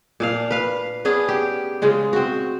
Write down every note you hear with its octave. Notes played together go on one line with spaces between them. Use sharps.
A#2 D4 F5
B4 F5
B3 C#4 D4 G#4
G4
C#3 G#3 F4
C4 F#4